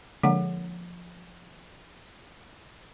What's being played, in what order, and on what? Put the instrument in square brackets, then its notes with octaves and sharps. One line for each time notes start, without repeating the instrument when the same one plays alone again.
[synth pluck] D3 G#3 A#3 [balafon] F3 F#5